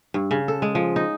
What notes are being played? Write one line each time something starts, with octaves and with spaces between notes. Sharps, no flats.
G2
C#3
A4
G#3
F3
D#4